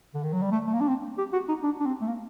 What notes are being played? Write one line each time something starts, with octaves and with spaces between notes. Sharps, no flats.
D3
D#3
F#3
G3
A3
A3
A#3
D4
C4
G4
F#4
D#4
D4
D4
C4
A3
A#3